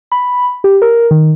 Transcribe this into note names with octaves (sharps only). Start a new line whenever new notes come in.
B5
G4
A#4
D#3